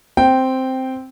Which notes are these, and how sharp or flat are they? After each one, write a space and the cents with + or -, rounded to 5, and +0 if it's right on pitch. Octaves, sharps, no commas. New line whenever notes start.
C4 +0 G5 -5